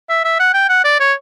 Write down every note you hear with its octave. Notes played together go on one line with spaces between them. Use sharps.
E5
E5
F#5
G5
F#5
D5
C#5